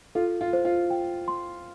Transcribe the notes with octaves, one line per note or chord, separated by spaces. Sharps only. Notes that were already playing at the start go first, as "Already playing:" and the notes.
F4 A4
F4
C5
F4
G5
C6